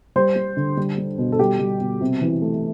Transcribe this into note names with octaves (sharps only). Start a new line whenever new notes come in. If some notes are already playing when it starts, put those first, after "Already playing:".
G3 C5
G3
D3
G3
G3
B2
A4
G3 G4
G3
B2
C3
E3
A3